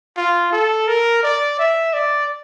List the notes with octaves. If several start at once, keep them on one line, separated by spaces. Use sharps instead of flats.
F4
A4
A#4
D5
E5
D5